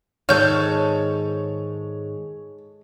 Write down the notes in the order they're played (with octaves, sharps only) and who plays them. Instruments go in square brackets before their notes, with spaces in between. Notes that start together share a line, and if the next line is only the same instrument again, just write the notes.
[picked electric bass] G#2 D#3 [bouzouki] G#3 A4 [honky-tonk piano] C#5 [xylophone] F6 G6